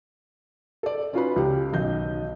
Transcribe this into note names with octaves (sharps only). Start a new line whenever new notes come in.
A4 D5
C#4 D#4 F4 F#4 B4 B5
C#2 G4
B1 D#3 D#5 G6